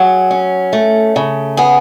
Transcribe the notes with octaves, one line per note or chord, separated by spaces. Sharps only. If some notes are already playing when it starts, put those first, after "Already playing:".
Already playing: F#3 G#4
C#4
A3
C#3
B3 G#4